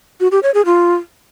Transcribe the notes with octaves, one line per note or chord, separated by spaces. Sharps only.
F#4
G4
C#5
G#4
F4